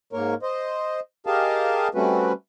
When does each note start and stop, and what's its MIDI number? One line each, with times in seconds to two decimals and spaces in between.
0.13 0.34 44
0.13 0.34 58
0.13 0.34 70
0.13 0.34 73
0.43 1.00 72
0.43 1.00 75
1.27 1.88 67
1.27 1.88 68
1.27 1.88 70
1.27 1.88 75
1.27 1.88 77
1.27 1.88 81
1.95 2.32 55
1.95 2.32 57
1.95 2.32 60
1.95 2.32 61
1.95 2.32 66
1.95 2.32 71